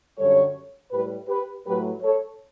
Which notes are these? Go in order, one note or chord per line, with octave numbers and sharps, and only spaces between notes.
F#2 D3 G3 A4 C#5
A2 G3 G4 B4
G4 B4
A2 F#3 A3 G4 B4
A4 C#5